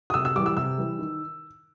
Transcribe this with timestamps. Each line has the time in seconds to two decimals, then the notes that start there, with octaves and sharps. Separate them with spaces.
0.10 D#6
0.14 C3 E6
0.25 E6
0.36 E3 G3 D6
0.46 E6
0.57 C3 E6
0.78 E3 G3
0.99 D#3